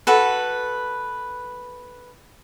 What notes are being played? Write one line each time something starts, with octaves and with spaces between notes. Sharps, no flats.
F#4 A4 B4